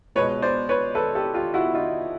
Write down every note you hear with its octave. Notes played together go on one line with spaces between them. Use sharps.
C#2 B2 G#3 B4 C#5
C5 D5
B4 C#5
A4 B4
G4 A4
F4 G4
E4 F#4
D#4 F4